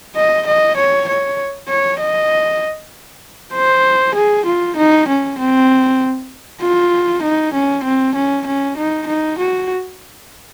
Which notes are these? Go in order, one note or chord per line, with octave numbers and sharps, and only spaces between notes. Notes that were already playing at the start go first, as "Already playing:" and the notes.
D#5
D#5
C#5
C#5
C#5
D#5
C5
G#4
F4
D#4
C#4
C4
F4
D#4
C#4
C4
C#4
C#4
D#4
D#4
F#4